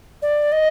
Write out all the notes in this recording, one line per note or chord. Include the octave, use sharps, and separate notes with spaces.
D5
D#5